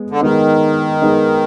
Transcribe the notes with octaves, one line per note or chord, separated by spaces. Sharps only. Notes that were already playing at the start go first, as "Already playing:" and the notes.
Already playing: G#3 B3
D3
D#3 G#3 B3 D#4
G#3 B3 D#4